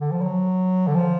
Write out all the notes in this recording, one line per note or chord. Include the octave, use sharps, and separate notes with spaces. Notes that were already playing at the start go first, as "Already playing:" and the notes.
D3
F3
F#3
D3
F3